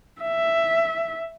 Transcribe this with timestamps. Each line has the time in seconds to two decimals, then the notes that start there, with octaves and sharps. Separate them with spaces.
0.21 E5